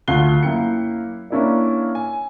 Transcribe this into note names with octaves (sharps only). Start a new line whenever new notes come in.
D2 A3 F4 F#6 C7 G7
F#2 A#3 E4 G5 C#7
A#3 C#4 D4 E4 A#4 D5
G#5